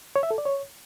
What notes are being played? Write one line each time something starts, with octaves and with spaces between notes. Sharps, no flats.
C#5
E5
A4
D5
C#5